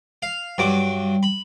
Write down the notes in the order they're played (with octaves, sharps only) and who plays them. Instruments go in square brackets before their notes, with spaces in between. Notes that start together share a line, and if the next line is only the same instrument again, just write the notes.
[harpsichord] F5
[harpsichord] G2 F#3 D6 [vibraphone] G3
[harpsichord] B5